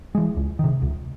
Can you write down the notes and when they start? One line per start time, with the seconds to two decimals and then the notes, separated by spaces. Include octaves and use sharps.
0.15 E3 G#3
0.36 C#2
0.59 C3 D#3
0.82 C#2